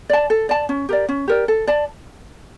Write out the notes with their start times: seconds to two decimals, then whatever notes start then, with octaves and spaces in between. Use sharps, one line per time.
0.10 D5 A5
0.30 A4
0.49 D5 A5
0.69 C#4
0.89 G4 A#4 D5
1.09 C#4
1.28 G4 A#4 D5
1.48 A4
1.67 D5 A5